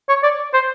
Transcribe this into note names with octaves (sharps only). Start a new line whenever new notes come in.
C#5
D5
C5